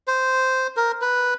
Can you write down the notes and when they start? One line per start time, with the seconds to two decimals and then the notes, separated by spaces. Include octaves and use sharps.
0.07 C5
0.77 A#4
1.01 B4